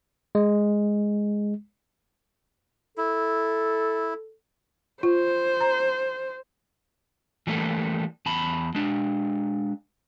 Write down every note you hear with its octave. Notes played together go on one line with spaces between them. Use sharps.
G#3
E4 A4
F4 C5
A#5
E3 G3 A3 A#3 A4
E2 A5 B5
G#3 D4